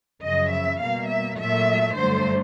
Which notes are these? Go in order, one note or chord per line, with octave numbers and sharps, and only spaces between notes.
F#2 C#3 F3 D#5
E5
B2 G3 A#3 F5
E5
A#2 F#3 A3 E5
G2 D3 F#3 A3 C5